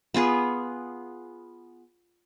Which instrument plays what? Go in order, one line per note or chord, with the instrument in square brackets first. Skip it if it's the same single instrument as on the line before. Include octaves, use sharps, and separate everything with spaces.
[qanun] B3 F4 G#4 B4